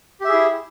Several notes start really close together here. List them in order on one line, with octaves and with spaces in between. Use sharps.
G4 E5 G#4 E4